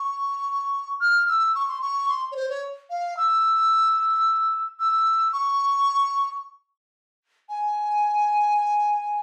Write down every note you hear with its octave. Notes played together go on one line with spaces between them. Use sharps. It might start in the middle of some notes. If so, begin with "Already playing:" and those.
Already playing: C#6
F6
E6
C#6
C6
C#6
C6
C#5
C5
C#5
F5
E6
E6
C#6
G#5